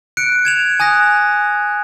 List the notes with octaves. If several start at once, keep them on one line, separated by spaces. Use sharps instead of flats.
F#6 C#7 D7
G#6 E7 F7
G#5 D#6 F#6 A#6